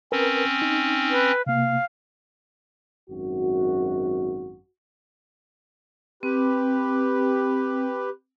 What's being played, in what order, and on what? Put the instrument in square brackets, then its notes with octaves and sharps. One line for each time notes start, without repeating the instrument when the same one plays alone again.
[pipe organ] C4 C#4 [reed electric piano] A#4 B4
[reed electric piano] D#4
[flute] B4
[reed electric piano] C3 A#3 [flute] F5
[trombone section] G#1 F#2 F#4
[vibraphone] C4 [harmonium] G4 B4